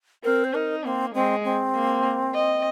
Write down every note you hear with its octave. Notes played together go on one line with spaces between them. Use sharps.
C4 A#4
C5
D#4 A#4
A#3 C4
G#3 C4
C4
A#3
D#5